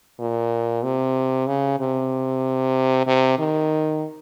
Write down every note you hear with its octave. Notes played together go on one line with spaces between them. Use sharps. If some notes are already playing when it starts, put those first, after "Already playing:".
A#2
C3
C#3
C3
C3
D#3